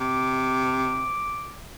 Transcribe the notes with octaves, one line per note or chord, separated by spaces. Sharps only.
C3 D6